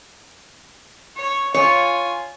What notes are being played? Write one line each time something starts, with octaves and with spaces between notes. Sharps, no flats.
C#5
F4 C#5 G#5